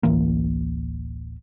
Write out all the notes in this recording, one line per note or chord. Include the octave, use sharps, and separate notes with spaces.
D1 A1 E3 A#3